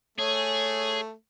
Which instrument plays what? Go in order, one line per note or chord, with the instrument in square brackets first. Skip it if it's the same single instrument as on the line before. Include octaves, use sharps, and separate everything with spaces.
[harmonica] A3 [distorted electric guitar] G#4 [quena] C#5